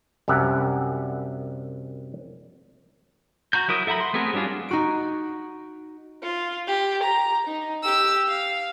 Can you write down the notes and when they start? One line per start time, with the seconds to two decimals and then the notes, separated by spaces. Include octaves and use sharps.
0.28 C2 F#2 G4 E5 F#5
3.53 F#4 A#5 G6
3.68 F#3 E4 A#4 D#6
3.87 A4 E5 F#5 A#5 B5
4.00 C6
4.13 A3 B3 C4 G#4 A#4
4.33 F#3 G3 D4 F4 G#4
4.69 D#4 F#4 D7
6.23 F4
6.67 G4
7.03 A#5
7.47 D#4
7.83 G4 E6
8.29 F5